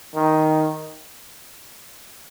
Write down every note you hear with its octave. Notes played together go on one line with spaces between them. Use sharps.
D#3